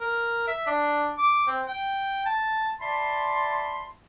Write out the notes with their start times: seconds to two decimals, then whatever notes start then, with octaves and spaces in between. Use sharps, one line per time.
0.01 A#4
0.47 E5
0.67 D4
1.18 D6
1.47 C4
1.68 G5
2.26 A5
2.80 D5 E5 A5 B5 C6